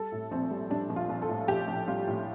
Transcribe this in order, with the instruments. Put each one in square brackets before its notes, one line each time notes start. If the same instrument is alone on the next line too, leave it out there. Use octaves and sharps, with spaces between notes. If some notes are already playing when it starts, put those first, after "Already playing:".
Already playing: [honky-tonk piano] G3 A4
A2
A#1 C4
G3
G3 D4
A#1
F4
A#1
A4
A2
A#1 G4
A#1
G3 F4
A2